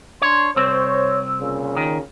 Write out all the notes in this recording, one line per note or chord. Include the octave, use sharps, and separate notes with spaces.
D4 C#5 C6
C2 C4 C5 C#5
A#2 C#3
D#3